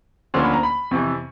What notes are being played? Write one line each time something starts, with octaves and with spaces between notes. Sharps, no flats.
D2 D3 F3 A#3 C#4 C6
B5
A#5
B5
F2 C3 E3 C#6